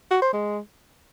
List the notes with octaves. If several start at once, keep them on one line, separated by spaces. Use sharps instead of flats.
F#4
C5
G#3